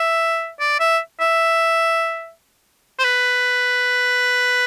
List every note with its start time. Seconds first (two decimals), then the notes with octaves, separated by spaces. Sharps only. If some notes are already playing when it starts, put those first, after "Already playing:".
Already playing: E5
0.59 D5
0.80 E5
1.20 E5
2.99 C5
3.04 B4